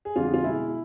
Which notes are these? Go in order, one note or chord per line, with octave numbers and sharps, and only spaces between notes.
G#4
F2 D3 G#3 F4
F4
B2 G#3 E4